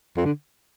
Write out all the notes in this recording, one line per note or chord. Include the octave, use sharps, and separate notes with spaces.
F2
D3